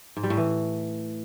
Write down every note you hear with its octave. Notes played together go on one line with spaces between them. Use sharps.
G#2
G3
A2
E3